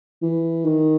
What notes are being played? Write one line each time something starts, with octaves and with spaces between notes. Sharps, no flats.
E3
D#3